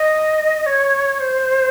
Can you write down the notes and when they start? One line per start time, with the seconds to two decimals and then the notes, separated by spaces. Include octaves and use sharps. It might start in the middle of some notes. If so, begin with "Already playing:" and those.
Already playing: D#5
0.66 C#5
1.20 C5